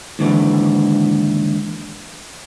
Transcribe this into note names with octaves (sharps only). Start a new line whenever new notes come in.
D#2 G#2 D3 E3